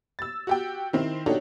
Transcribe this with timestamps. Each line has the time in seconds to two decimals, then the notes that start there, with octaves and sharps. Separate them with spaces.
0.19 E6 A6
0.47 F#4 G4 G5
0.93 D#3 C4 E4
1.26 D4 D#4 F#4 G4 A4 C#5